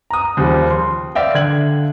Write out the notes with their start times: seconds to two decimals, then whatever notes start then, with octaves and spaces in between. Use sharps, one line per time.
0.10 A#5 D#6
0.37 D#2 C#3 F3 G3
0.71 C6
1.15 D5 E5 F5 G5
1.35 D3 G#6 F#7